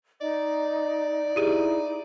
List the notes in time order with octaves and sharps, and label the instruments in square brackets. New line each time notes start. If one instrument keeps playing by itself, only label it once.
[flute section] D#4 D#5 [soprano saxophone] D5
[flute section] D#4 [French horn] E4 [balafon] G4 G#4